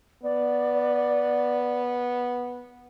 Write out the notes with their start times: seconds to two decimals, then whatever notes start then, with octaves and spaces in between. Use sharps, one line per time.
0.24 B3 D5